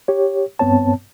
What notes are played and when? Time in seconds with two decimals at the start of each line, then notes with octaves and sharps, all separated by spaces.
0.08 G4 C#5
0.59 G2 B3 C4 C#5 A5